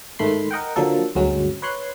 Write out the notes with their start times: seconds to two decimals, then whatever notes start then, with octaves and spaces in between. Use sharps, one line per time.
0.19 G#2 D#3 A3 B5 C6 C7
0.51 A#4 D#5 F#5 G5
0.76 D3 F3 F#3 A#3 A4
1.15 D2 G2 F#3 G#3 C#4
1.62 B4 C#5 C6 F#6